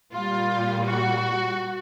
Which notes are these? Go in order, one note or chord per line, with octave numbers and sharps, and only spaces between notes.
A#2 G3 F4
F#4